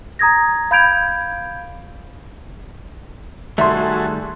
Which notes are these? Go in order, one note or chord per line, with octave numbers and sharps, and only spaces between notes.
A#5 D#6 G#6 A#6
F5 B5 G6 G#6 D7 F7
D#3 G3 A3 F#4 G#4 A4 E5 C6